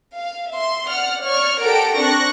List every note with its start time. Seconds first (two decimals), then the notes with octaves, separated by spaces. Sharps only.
0.17 F5
0.52 E5 C6
0.89 D5 F#5 F6
1.26 C#5 D5 C#6 F6
1.61 G4 A4 A#4 F#5 A#5 D7
1.99 C4 D4 C#6 F#6 A#6